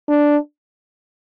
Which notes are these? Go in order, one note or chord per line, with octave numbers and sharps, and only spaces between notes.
D4